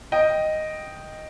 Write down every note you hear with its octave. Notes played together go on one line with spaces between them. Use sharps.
D#5 G5